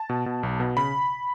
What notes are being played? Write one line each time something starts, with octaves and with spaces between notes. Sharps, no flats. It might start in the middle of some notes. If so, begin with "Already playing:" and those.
Already playing: A5
B2
B2
B1
B2
C#3 B5